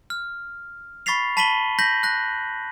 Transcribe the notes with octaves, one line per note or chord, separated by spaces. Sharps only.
F6
B5 C#6 A6 B6 C7 F7
A5 B5 B6 D#7 F#7 G7
G6 A#6 B6 F#7
F#6 A#6